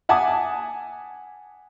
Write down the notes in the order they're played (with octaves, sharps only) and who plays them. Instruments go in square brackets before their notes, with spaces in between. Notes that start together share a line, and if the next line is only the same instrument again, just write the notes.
[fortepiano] E5 F#5 G#5 A5 D6 D#6